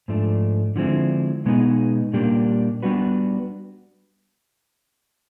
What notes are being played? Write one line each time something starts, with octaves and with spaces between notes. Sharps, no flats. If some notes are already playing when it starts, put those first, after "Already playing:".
G#2 F3 A3 D4
D3 F3 G#3 C4 E4
B2 G#3 B3 D#4 G#4
A#2 G3 A#3 D4 G4
G3 B3 D4 F#4 B4